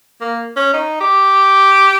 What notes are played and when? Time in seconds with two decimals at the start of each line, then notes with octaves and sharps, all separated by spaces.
0.21 A#3
0.56 C#4
0.73 D#4
1.00 G4